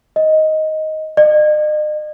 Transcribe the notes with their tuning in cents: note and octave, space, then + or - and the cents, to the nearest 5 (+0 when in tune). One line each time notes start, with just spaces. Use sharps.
D#5 +10
D#5 -45